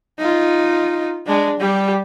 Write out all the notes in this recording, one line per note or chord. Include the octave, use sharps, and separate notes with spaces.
D#4 F4
G#3 D4
G3 G4